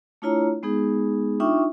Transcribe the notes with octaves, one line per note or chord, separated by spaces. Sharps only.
A3 D4 E4 F4 C#5 A#5
G#3 B3 D#4 G#4
D4 D#4 F4 E5 G5 C#6